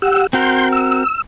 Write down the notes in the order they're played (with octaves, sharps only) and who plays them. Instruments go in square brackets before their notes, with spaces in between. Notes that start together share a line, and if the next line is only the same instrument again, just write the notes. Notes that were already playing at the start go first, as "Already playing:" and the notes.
[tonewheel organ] G4 F#5 E6
[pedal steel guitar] C4 F#4 A#4 [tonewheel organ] C6 G6
[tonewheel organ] E6